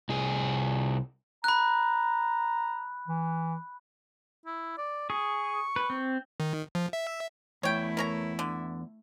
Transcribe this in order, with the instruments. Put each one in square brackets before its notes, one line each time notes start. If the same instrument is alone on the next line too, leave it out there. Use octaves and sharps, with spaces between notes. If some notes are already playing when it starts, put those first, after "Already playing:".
[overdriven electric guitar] C2 G#4
[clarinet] A#5 [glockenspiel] B5 F#6
[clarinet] E3
[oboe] E4
D5
[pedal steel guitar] G#4 [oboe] C#6
[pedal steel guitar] B4
C4
[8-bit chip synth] D#3
F3
E5
[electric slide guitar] E2 [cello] A3 E4 [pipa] C#5 G5
[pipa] A#4 C#5 A#5
D3